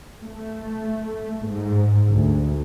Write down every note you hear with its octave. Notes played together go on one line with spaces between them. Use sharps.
A3
G#2
D2